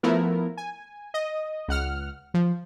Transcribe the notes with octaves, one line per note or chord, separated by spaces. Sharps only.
F3 A3 B3 E4 A#4
G#5
D#5
C#2 F#5 F6
F3